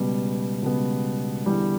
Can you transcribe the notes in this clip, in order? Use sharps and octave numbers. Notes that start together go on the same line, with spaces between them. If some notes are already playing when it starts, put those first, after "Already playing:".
Already playing: C#2 B2 G3 B3
C#2 B2 G3 B3
E2 D3 G3